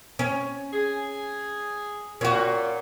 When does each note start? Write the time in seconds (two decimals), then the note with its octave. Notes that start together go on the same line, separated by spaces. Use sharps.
0.19 C#4
0.73 G#4
2.21 A#2 C#4 F#4